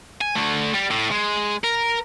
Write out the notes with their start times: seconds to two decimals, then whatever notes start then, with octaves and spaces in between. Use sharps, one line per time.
0.21 G#5
0.36 D3 A3
0.74 G3
0.91 A2
1.12 G#3
1.64 A#4